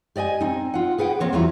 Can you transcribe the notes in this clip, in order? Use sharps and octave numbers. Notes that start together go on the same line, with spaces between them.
G4 D5 D#5 G5 G#5
C4 D#4
F4 F#5
G#4 B4 F#5 G5
A#3 C4 C#5
E2 F#3 G3 E4 F4 A#5